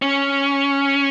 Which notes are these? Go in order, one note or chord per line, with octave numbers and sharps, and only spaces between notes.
C#4